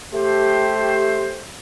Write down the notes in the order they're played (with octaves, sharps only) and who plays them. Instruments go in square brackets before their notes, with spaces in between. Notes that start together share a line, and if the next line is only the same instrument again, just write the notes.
[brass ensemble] A3 G4 C5